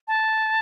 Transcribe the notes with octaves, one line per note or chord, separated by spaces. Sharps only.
A5